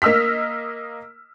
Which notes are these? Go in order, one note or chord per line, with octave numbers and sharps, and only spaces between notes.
A#3 D#5 E6 F6 B6